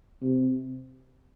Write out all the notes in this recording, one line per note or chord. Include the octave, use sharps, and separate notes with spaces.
C3